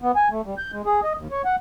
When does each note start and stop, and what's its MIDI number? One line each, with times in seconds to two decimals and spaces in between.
0.02 0.12 59
0.16 0.29 80
0.31 0.41 57
0.45 0.55 55
0.58 0.72 91
0.72 0.82 56
0.86 1.00 68
1.04 1.13 75
1.17 1.27 39
1.31 1.42 73
1.45 1.56 78